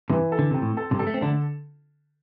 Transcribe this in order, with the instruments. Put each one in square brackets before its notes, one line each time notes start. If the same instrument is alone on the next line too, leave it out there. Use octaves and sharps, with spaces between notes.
[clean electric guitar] G2 C3 [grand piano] E3
[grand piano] A4
[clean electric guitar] D3
[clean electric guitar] C3 [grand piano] C4
[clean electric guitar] A2
[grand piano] A4
[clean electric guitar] G2 C3
[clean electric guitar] G3 [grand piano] A4
[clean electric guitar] A3
C4
[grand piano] D3 [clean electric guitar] A3 D4